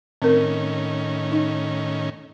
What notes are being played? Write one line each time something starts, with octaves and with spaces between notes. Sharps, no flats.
A2 D#3 C4 C#4 A#4
D#4